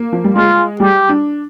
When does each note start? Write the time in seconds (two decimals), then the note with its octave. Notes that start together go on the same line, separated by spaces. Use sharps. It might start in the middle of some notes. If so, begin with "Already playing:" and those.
Already playing: A#3
0.13 F3
0.24 G3
0.35 G#3 F4
0.80 G3 G4
1.09 D4